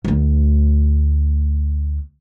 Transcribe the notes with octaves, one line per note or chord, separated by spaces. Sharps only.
D2 A3